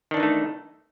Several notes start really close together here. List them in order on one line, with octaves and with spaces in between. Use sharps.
D#3 D4 E3 D#4 A3